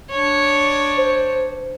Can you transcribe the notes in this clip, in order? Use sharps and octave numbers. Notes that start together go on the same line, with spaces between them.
D4 C#5
C5